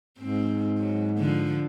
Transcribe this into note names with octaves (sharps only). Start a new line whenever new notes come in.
G#2 C4
F#3
D3 F3